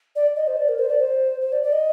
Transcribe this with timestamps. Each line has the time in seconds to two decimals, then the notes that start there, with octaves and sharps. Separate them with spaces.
0.16 D5
0.36 D#5
0.47 C5
0.57 D5
0.69 A#4
0.79 C5
0.89 D5
1.00 C5
1.41 C5
1.52 D5
1.63 D5
1.73 D#5